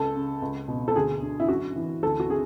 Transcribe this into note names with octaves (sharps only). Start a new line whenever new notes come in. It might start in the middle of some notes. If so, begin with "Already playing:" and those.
Already playing: C#2 A4
C#3
C#2
B2
A4
D2 G#4
D3
E4
F#2 F#4
E3
D2 A4
F#4
D3 G#4